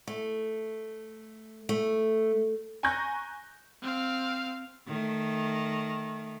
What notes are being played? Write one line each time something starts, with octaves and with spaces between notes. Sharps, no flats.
A3
A3
G#5 A#5 C#6 F#6 G6 A#6
C4 F5
D#3 A3